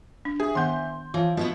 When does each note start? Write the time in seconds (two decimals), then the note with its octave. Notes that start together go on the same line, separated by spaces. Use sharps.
0.25 D4
0.40 E3 G#4
0.55 D#3 B3 F#5 C6 G6
1.14 E3 F3 F4 C#5
1.37 B2 F3 B3 E4 B4